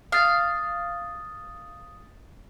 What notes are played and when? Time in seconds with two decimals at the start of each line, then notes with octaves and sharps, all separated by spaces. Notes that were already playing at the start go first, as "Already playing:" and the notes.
0.12 F5 D#6 A6